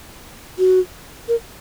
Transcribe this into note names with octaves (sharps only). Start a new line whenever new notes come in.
F#4
A#4